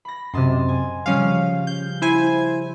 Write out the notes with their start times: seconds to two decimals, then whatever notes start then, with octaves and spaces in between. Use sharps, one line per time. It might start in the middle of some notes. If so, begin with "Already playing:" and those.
0.05 B5 A#6
0.34 F#2 C3 D#5 A5 C6
0.68 G#5
1.06 C#3 F3 G3 C#4 F5
1.67 G6
2.02 E4 C5 G#5